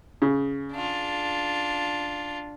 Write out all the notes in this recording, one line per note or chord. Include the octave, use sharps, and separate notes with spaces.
C#3
D4 F4